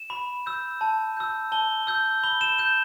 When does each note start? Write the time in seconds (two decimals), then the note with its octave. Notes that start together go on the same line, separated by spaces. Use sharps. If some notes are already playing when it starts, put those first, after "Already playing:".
Already playing: E7
0.10 B5
0.46 E6 G6
0.81 A5
1.17 E6 G6
1.52 A5 G7
1.87 E6 G6
2.24 B5 G7
2.41 E7
2.58 G6 E7